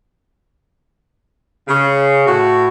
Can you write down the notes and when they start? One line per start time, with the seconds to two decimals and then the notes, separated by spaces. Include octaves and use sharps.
1.68 C#3
2.26 A2 F#4